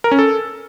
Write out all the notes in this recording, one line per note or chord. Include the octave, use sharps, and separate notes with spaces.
A#4
C#4
A4